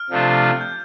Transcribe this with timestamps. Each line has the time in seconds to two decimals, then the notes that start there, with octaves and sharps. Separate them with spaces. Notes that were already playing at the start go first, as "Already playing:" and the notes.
Already playing: F6
0.10 C3 F3 A3 D4 F4
0.61 G6